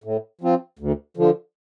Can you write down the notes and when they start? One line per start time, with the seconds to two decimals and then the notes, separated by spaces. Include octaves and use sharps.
0.04 A2
0.41 F3 C4 F4
0.79 D2
1.17 D3 F3